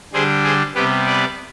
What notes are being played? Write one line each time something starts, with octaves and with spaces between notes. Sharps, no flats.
D3 G3 D4 G#4 C5
G#4 C5
C3 G3 B3 G4 B4
B4 D5